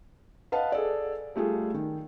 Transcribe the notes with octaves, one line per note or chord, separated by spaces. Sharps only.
B4 D#5 F5 F#5 A5
G#4 A4 D5
G3 A3 F4 G#4
D#3